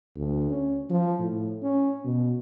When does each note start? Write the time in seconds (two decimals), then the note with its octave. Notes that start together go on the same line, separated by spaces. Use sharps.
0.16 D2
0.50 C#4
0.90 F3
1.20 A2
1.62 C#4
2.05 B2